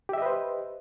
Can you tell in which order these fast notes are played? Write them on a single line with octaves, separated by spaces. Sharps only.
G4 E5 D#5 B4 C5